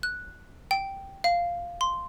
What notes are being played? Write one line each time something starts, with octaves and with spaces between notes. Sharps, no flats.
F#6
G5
F5
C6